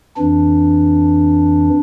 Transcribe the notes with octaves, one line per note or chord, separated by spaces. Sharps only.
F2 E3 D4